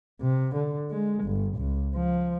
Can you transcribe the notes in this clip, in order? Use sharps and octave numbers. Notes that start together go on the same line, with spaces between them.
C3
D3
G#3
G1
C#2
F3